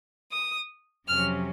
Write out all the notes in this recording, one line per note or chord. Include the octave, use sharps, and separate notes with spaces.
D#6
F2 C3 F#3 C#4 F6